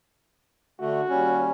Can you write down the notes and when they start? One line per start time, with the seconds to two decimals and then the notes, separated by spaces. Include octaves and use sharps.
0.81 D3 A3 F#4
1.09 D#2 G3 C#4